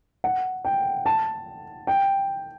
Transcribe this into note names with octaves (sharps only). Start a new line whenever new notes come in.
F#5
G5
A5
G5